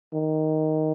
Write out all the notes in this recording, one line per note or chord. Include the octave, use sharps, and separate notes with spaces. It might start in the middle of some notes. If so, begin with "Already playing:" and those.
D#3